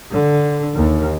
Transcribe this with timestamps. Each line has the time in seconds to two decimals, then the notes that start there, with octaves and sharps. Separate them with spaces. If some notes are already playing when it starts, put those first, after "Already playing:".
0.13 D3
0.76 D#2